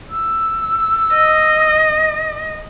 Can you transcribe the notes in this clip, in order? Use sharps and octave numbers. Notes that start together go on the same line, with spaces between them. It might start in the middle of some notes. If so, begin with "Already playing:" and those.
E6
D#5